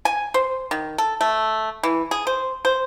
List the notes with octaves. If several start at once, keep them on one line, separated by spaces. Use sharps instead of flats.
G#5
C5
D#3
A4
A3
E3
G#4
C5
C5